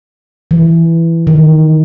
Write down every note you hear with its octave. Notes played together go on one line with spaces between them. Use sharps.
E3
D#3